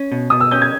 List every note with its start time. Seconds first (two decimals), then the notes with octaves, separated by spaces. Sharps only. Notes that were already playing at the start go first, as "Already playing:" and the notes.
Already playing: C#4
0.12 B2
0.30 B2 D#6
0.40 E6
0.51 C#4 G6
0.62 G#6